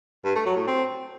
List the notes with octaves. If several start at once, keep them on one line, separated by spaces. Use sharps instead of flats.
G2
A3
F#3
A2
C4